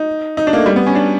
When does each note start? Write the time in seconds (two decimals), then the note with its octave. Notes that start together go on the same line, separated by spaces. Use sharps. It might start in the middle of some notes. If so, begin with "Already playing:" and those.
Already playing: D#4
0.37 D#4
0.47 D4
0.53 A#3
0.57 A3
0.66 G3
0.76 B3
0.86 C#4
0.95 D4